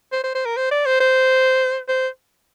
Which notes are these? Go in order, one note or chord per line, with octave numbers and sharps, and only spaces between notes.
C5
C5
C5
A#4
C5
D5
C5
C5
C5